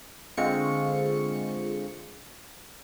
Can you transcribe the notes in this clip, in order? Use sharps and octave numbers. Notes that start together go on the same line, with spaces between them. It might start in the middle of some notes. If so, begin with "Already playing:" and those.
D3 G#3 C4 F4 C#6 C#7